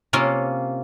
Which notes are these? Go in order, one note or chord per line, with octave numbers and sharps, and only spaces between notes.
C3 A#3 C#4 F4